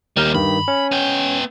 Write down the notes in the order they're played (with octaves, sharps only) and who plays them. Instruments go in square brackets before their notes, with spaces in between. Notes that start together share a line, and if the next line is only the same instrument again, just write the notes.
[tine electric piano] D#2 A#4 F6 [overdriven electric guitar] G3 D#4
[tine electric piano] G2 D#3 [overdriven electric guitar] B5
[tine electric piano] C#4
[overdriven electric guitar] B3 G5